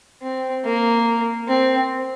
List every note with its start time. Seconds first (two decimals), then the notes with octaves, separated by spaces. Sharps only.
0.22 C4
0.65 A#3
1.48 C4